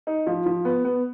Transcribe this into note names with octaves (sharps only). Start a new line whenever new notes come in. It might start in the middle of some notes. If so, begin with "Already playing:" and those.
D#4
F3
F3
B3
B3